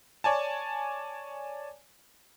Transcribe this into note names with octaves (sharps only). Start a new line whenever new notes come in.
C#5 D5 G#5 A5